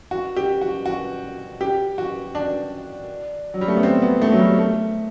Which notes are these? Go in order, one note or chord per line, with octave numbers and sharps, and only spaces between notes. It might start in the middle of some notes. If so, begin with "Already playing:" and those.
F#4
G4
F#4
F#4
G4
F#4
D4
F#3
G3
A3
B3
C4
B3
A3
F#3
G3
A3